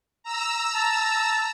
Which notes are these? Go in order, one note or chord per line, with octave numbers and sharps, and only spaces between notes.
A#5 E6
A5